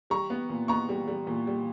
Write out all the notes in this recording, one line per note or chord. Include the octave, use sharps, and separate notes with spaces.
G3 A#5 C#6
B3
A#2
B3 A#5 C#6
G3
G3
A#2
G3